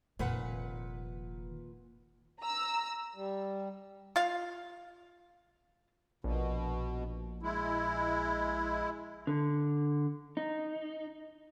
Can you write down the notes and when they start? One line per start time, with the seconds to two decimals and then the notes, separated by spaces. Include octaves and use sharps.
0.19 F1 A#2 D#3 B4 F#5
2.40 A#5 E6
3.15 G3
4.16 F4 F5
6.24 A#1 B2
7.43 G#3 E4
9.27 D3
10.37 D#4